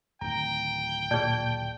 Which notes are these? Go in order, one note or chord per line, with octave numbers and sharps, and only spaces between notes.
D1 D#3 G5 A#5
A#2 G#4 D5 A5 G6